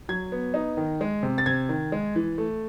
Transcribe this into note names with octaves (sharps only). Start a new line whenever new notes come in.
F#3 G#6
B3
D#4
D#3
G#3
C3
A6
C3 G#6
D#3
G#3
E3
A3